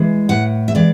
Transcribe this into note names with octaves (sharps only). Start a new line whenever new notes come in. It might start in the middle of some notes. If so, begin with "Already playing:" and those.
Already playing: E3 G#3
A2 F#5
E5
E3 G#3 D5